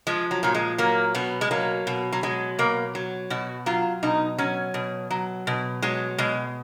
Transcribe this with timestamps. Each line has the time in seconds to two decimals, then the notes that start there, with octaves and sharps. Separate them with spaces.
0.07 F3 G#3
0.31 F#3
0.43 A#2 F#3
0.55 G#3
0.78 F#3 A#3
1.15 B2 B3
1.41 G#3
1.51 F#3 A#3
1.87 B2
2.13 F#3
2.23 F#3 G#3
2.59 B2 A#3
2.95 F#3
3.30 B2 F#4
3.66 F#3 F4
4.03 B2 D#4
4.38 F#3 C#4
4.74 B2
5.11 F#3
5.47 B2
5.82 F#3 G#3
6.18 B2 G#3